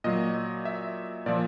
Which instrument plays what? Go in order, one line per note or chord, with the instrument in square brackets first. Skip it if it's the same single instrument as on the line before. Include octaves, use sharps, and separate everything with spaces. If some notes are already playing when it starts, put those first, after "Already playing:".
[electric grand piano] A#2 F#3 D#5
E5
A#2 F3 D5